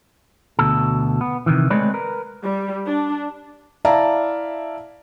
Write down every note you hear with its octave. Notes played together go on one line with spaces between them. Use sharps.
D2 B2 A4
B3
C3 D#3 E3
G#3 A3 C4 B4 C#5 D5
A#4 B4
G3
D4
E4 D5 E5 F5 A5 A#5